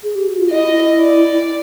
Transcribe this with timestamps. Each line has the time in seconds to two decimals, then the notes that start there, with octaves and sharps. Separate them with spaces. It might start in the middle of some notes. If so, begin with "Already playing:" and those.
0.03 G#4
0.15 G4
0.27 F#4
0.38 F4
0.50 E4 D#5
0.98 D5